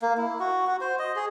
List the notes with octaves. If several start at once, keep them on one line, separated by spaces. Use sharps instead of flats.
A#3
E4
F#4
F#4
C5
D#5
G#4